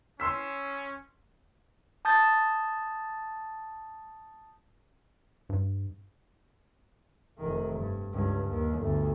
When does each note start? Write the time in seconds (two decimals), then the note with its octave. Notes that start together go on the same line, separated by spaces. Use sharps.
0.20 C#4 C6 E6 B6
2.05 A5 D#6 G6 A6
5.49 G2
7.38 F1 D#3
7.76 G2
8.12 C#2 G2
8.47 D#2
8.79 G1 D2